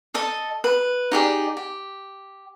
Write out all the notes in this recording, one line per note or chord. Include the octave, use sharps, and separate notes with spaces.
A4 D#5 A5
B4
D#4 G4 G#4 D5
G4